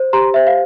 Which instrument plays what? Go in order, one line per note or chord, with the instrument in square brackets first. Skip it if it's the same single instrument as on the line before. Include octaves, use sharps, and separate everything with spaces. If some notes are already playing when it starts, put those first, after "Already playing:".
Already playing: [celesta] C5
G4 A#5 C6
C5 E5
F5